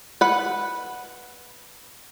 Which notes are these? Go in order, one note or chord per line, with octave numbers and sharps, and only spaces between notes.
B4 F#5